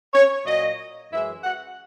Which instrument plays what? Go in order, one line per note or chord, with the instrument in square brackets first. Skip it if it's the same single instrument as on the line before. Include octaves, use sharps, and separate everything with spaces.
[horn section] C#5
A#2 F#3 D#5
F#2 E3 G#3 E5
F#5